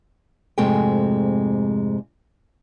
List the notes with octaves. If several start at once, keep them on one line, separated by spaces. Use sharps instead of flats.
F2 G#2 C3 G#3 A3 G5